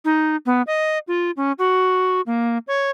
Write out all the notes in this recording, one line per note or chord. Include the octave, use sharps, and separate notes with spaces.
D#4
B3
D#5
F4
C#4
F#4
A#3
C#5